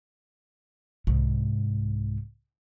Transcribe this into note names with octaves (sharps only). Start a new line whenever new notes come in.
C2 G#2